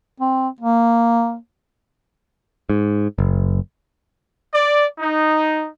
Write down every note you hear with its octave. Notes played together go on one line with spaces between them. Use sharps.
C4
A#3
G#2
F#1
D5
D#4